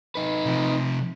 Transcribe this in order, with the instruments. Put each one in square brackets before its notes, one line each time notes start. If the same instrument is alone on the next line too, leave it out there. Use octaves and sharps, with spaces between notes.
[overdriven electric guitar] D#4 B4
[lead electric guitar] C3 F3